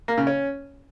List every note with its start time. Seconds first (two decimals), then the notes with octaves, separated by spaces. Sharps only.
0.08 A#3
0.18 C#3
0.27 C#4